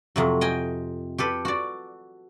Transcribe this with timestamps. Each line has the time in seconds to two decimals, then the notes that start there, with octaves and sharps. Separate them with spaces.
0.16 F2 C3 F#3
0.41 D#5 G5 G#5
1.18 G4 A4 B4
1.45 F#4 D5